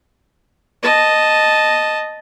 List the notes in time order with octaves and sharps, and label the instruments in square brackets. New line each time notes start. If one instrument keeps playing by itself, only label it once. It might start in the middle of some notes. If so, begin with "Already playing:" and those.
[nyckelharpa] D#5 A5